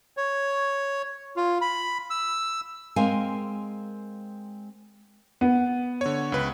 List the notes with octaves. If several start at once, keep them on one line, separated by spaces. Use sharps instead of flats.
C#5
F4
B5
E6
G#3 C4 A#4 F5 G#5
B3
D3 C#5
C#2 B4